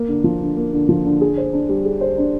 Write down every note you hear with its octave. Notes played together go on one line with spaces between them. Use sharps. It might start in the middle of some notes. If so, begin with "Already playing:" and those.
Already playing: A#3
D3
F3
D3
A#3
D3
F3
D3
G#4
C5
D4
G3
G#4
C5
D4